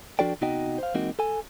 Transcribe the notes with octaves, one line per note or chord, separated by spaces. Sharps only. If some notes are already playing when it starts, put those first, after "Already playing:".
F3 D4 F#4 A4 D5 G5
C3 B3 D#4 F#4 D#5 G5
C5 F5
E3 G#3 A#3 C4 D#4 F#4
A4 G#5